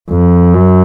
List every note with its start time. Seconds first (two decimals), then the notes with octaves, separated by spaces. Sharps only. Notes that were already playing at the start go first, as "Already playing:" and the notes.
0.11 F2
0.53 F#2